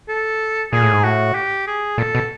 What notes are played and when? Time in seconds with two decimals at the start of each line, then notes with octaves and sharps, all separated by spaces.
0.09 A4
0.72 A#2 G#4
0.82 A2
0.93 G#2
1.04 A2 F#4
1.35 G4
1.67 G#4
1.98 A#2 A4
2.15 B2